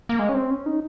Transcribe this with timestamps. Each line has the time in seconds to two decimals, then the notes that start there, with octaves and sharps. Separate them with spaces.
0.09 A#3
0.19 G#3
0.29 C#4
0.34 C4
0.51 C#4
0.66 D#4